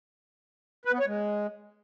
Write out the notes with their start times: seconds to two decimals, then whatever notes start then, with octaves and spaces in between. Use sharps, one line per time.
0.85 B4
0.92 B3
1.00 C#5
1.07 G#3